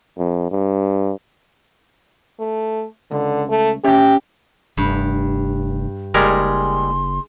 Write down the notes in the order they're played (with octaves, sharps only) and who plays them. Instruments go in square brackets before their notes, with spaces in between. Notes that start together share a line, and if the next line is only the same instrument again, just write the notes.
[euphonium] F2
G2
[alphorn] A3
[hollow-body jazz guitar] C#2 [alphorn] D3
[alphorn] A3
[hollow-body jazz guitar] C#4 E5 G5 [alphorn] G4
[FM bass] F1 [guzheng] G2
[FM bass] F#1 [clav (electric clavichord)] G3 G#3 A#4 [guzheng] G#4 [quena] C6